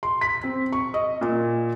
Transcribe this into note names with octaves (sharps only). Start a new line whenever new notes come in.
C6
B6
C4
C#6
D#5
A#2